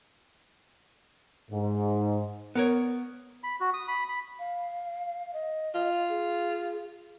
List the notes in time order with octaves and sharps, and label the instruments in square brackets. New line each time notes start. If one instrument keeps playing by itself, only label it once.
[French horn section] G#2
[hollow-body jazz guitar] B3 A#4 C#5
[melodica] B5
F#4
D#6
B5
B5
[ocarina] F5
D#5
[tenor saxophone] F4
[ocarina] G#4